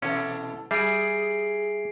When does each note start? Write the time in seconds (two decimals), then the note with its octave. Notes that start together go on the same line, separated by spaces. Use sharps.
0.02 B2 E3 C#4 A4
0.71 G3 G#4 E5 C7 D7